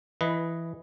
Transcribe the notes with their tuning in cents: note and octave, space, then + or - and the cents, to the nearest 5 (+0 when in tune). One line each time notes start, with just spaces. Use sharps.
E3 +10 B4 +0 D#5 +0